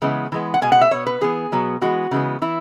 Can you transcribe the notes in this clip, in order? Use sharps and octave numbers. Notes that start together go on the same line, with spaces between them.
C#3 E3 G#3 B3
E3 G#3 B3
F#5
B2 G#3 B3 G#5
F#5
E5
B2 B3 C#5
B4
E3 B3 G#4
B2 F#3 B3
E3 G#3 B3 F#4
C#3 E3 G#3 B3
E3 E4